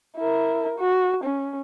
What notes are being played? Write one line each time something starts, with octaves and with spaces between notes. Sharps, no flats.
E4 A#4
F#4
C#4